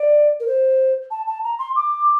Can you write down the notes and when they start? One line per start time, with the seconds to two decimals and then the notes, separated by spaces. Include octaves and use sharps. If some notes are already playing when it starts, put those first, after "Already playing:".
Already playing: D5
0.40 A#4
0.47 C5
1.11 A5
1.27 A5
1.44 A#5
1.58 C6
1.76 D6